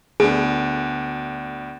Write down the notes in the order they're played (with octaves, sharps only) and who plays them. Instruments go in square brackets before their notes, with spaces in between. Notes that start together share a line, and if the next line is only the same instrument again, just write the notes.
[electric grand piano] D2 B3 D4 [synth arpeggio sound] G#4